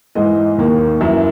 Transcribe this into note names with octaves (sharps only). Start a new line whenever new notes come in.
G#2 E3 G#3 D#5
D#2 D#3 A#3
F#2 E3 A#3 E5